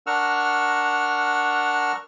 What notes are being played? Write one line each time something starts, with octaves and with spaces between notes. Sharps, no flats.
D4 A#4 F#5 C#6 E6 F6